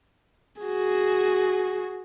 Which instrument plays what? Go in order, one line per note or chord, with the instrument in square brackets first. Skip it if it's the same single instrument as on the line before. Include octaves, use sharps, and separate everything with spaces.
[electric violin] F#4 G#4